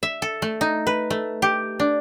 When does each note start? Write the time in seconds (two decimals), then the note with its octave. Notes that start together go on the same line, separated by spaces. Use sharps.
0.03 E5
0.22 A4
0.42 A3
0.61 D#4
0.87 B4
1.10 A3
1.42 G4
1.80 D4